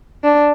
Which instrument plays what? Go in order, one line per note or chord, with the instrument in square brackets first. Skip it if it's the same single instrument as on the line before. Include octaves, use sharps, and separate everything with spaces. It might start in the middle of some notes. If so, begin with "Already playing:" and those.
[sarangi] D4